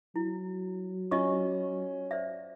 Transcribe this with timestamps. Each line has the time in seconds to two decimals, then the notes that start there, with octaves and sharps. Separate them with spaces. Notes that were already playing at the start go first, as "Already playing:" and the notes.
0.16 F#3 E4
1.11 C#4 F4 D#5 C#6
2.11 C5 D5 E5